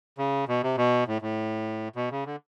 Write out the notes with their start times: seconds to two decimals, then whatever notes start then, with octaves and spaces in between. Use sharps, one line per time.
0.18 C#3
0.48 B2
0.63 C3
0.77 B2
1.07 A2
1.22 A2
1.96 B2
2.11 C#3
2.26 D3